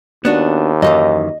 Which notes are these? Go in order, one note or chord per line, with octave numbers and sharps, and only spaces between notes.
D#2 B3 D4 F#4
F#2 D#3 E3 D#5